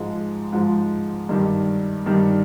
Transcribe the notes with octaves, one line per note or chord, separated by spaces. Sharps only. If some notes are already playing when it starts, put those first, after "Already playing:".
Already playing: G#2 F3 G#3
G#2 F3 G#3
G2 D#3 G3
G2 D#3 G3